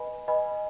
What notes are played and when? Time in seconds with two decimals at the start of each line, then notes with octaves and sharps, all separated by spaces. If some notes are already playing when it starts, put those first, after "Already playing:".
Already playing: B4 D#5 G#5 B5
0.28 B4 D#5 G#5 B5